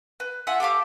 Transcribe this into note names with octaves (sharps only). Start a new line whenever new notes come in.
B4
F4 E5 F#5 G#5
G4 A4 F5 D6